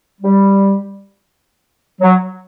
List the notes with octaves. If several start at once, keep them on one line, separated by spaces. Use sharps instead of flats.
G3
F#3